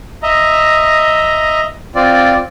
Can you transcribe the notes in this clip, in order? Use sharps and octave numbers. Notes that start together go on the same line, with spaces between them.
D#5 E5 A#5
C4 F4 D5